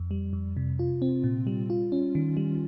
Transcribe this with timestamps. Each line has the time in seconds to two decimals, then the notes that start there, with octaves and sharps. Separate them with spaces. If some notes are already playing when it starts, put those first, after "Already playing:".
Already playing: F2
0.11 G3
0.33 F2
0.57 C3
0.79 F4
1.02 C4
1.24 A#2
1.47 G3
1.70 F4
1.92 C#4
2.15 D#3
2.37 G3